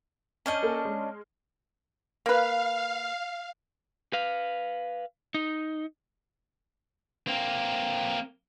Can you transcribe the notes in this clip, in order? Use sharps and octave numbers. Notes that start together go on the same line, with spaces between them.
C#4 D4 D#5 G#5 F6 G6
A#3 A4
G#3
A#3 B4 F5
B4 F5
D#4
A#3 C4